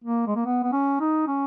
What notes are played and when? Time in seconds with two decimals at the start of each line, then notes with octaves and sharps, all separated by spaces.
0.04 A#3
0.27 G#3
0.36 A#3
0.45 B3
0.63 B3
0.72 C#4
1.00 D#4
1.27 C#4